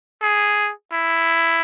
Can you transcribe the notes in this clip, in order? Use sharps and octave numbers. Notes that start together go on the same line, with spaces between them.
G#4
E4